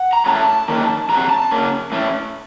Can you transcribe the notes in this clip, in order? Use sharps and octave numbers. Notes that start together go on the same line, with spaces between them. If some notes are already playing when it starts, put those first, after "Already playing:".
Already playing: F#5
A#5
A2 F#3 A3 C#4 A5
D#3 A#3 C#4
F2 C3 F#3 C4 A#5
A5
C#3 F#3 A#3 C#4
A2 A3 C#4